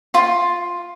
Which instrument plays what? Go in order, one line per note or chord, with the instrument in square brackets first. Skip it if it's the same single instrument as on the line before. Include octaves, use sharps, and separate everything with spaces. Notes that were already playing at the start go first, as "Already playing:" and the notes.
[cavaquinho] F4 C6